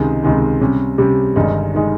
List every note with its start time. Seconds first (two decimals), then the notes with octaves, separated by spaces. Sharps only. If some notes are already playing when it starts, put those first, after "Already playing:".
Already playing: C#2 C3 D#3 G#3
0.23 C#2 C3 D#3 G#3
0.61 C3 G3 C#4
0.98 C3 G3 C#4
1.36 G1 G2 D#3 G#3 D#4
1.74 D#3 G#3 D#4